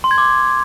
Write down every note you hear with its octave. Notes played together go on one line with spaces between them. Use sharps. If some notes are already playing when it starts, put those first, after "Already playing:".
C6
G#6
D6